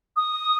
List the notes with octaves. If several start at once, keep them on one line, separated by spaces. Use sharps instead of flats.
D#6